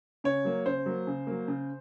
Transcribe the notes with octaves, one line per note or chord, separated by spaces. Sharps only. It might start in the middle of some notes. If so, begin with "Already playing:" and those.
C#3 C#5
F#3 A#3
C#3 C5
F#3 A#3
C#3
F#3 A#3
C#3